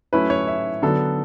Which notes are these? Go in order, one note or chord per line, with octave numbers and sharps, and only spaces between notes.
F#3 A3 C#4 E4 B4
C#5
E5
D3 F#3 B3 A4